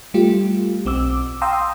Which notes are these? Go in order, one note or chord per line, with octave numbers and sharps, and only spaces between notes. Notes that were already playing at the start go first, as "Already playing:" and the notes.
G3 A3 F4 G4
B1 C4 D6 E6
F5 G5 A#5 C6 D#6 E6